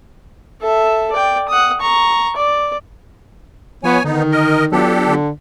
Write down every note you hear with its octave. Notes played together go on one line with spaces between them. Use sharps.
A4 E5
D5 G5
F#5 D#6
A#5 C#6
D5
F3 B3 F4 C#5 G#5
D3 D#3 B3 D#4
A#4 D#5
F#3 B3 D4 F4 G4 A4
D3